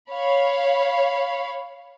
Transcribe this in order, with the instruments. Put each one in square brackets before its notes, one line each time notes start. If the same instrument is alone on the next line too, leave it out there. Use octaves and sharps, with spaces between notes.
[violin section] C#5 F5 B5